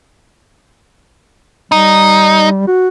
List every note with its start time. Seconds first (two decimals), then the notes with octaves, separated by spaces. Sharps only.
1.72 G3 D#4
2.67 F#4